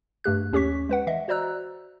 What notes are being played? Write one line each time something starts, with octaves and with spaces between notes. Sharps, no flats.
G2 A3 G4 F#6
D#2 C#4 G4 C#5 C#6 B6
G#3 B4 F#5
E3 D#5 E5
F#4 C5 D5 A#5 E6 F#6